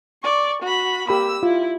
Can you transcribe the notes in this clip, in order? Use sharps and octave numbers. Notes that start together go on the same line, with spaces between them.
D5 C#6
F#4 B5
A#3 G4 B5 E6
E4 F4